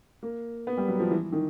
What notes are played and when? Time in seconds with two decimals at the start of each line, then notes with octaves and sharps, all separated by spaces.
0.23 A#3
0.67 B3
0.77 G3
0.88 F#3
0.99 F3
1.11 E3
1.32 D#3